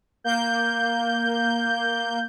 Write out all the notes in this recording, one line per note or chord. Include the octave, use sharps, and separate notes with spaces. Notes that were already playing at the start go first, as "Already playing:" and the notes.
A#3 G6